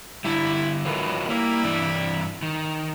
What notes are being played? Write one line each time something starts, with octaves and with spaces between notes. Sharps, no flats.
D3 G3 E4
A2 D#3 F#3 F4 B4
G3 A#3 E4
G2 E3 D4
D#3